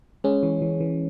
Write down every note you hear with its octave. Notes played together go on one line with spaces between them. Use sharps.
G#3 C#4
E3
E3
E3